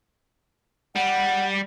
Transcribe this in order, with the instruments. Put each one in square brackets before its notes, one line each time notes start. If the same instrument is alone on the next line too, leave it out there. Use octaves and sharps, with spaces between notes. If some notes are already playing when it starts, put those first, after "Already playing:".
[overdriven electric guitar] G3 [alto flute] F#5